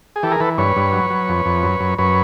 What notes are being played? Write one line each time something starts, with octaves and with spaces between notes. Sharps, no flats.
G#4
E3 G4 A4
G#4 A#4
E3 A4 B4
G2 B4 C#5
G2
F#3
F#3
F2
F2
F#2
F#2
F#2 B4 C#5